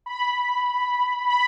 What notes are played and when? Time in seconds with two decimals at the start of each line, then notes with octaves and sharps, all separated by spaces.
0.06 B5
1.29 B5